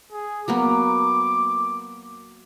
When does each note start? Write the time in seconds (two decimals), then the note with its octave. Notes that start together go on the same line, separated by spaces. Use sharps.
0.12 G#4
0.48 F#3 A#3 B3 D6